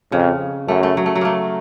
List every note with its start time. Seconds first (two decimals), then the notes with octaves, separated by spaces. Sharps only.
0.12 F2 C#3
0.68 F#2 A3
0.83 A3
0.97 F#3
1.06 A3
1.15 F#3
1.21 A3 A#3